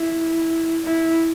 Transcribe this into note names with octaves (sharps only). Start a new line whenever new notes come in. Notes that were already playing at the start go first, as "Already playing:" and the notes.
Already playing: E4
E4